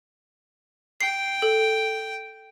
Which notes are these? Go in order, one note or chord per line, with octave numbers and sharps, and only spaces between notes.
G5 C7
A4